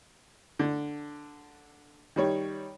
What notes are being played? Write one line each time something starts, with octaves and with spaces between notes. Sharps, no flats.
D3
D#3 G3 C#5